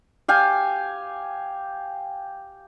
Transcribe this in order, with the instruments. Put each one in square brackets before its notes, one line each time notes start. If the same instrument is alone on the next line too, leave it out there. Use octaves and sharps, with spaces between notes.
[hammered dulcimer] G4 F5 G5 G#5